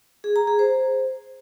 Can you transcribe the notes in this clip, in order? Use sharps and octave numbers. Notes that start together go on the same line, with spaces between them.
G#4
A#5
G#4
C5